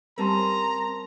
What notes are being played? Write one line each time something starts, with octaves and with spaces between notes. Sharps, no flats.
G3 C4 C#4 A#4 A5 A#5 C6